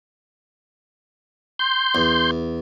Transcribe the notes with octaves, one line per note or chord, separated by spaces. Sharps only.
C6 G6
E2